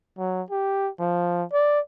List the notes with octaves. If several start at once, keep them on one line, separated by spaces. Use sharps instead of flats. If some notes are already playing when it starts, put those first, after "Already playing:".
F#3
G4
F3
D5